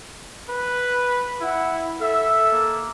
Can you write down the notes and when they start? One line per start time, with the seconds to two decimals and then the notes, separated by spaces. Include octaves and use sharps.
0.49 B4
1.41 E4 F#5
2.01 A4 E5
2.52 A#3